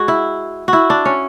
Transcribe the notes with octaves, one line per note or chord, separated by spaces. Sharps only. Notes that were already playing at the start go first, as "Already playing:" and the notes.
Already playing: G#3 F#4 G#4
E4
F#4
E4
D4
C#4